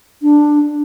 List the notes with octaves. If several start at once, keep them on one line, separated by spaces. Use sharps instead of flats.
D4